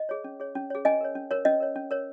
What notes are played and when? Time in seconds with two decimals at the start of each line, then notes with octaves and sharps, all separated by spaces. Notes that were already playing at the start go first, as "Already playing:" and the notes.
Already playing: D#5
0.09 G#4 C#5
0.24 C#4
0.40 G#4 C#5
0.55 C#4
0.70 G#4 C#5
0.85 C#4 D#5 G#5
1.01 A#4 C#5
1.15 C#4
1.31 A#4 C#5
1.45 C#4 D#5
1.60 A#4 C#5
1.76 C#4
1.91 A#4 C#5